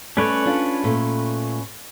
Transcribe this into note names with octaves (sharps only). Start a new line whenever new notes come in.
A3 C#4 B4 C#5 D5
D4 F4
A#2 A3